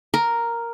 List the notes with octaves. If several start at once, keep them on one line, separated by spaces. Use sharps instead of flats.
A#4